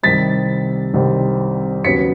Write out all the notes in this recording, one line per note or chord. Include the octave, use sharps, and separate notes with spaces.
C2 C3 D#3 G3 C4 A6 B6
C2 C3 D#3 G3 C4
D#2 C#3 F#3 B3 B6 C#7